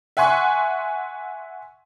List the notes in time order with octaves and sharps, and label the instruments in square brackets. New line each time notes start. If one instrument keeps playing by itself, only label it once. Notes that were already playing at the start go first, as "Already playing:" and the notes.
[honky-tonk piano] E5 F#5 G#5 C6 C#6